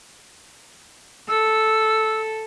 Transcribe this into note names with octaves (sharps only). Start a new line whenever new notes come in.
A4 E6